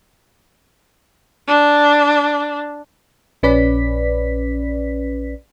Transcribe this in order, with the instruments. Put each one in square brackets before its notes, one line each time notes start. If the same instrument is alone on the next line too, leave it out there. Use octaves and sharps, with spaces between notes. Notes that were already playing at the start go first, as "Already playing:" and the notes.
[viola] D4
[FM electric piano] A#1 C#4 B4 D5 B6